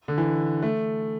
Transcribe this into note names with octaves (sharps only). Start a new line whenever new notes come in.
D3
E3
A3